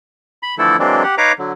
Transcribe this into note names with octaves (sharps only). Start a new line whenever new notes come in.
B5
D3 E3 F3 A3 E4 A4
E3 F#3 G#3 A#3 C4 D4
G4 F#5
D#4 B4 C#5 F5 A#5 D6
D3 F#3